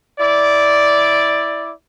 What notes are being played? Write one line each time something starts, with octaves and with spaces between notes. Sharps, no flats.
E4 D5